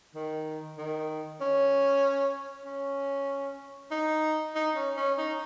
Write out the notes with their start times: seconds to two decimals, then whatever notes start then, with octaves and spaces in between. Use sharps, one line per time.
0.15 D#3
0.78 D#3
1.41 C#4
2.65 C#4
3.91 D#4
4.55 D#4
4.76 C#4
4.97 C#4
5.18 D#4